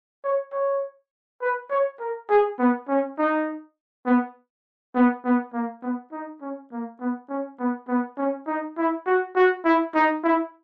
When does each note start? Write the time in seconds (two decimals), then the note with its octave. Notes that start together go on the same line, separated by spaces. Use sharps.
0.24 C#5
0.53 C#5
1.42 B4
1.71 C#5
2.00 A#4
2.30 G#4
2.59 B3
2.89 C#4
3.19 D#4
4.06 B3
4.95 B3
5.25 B3
5.54 A#3
5.83 B3
6.12 D#4
6.41 C#4
6.72 A#3
7.01 B3
7.30 C#4
7.60 B3
7.88 B3
8.18 C#4
8.47 D#4
8.78 E4
9.06 F#4
9.36 F#4
9.65 E4
9.95 D#4
10.24 E4